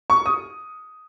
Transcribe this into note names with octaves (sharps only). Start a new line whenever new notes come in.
C#6
D#6